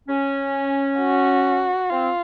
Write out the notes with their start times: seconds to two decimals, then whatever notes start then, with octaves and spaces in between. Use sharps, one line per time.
0.08 C#4
0.99 F#4
1.90 C4 F4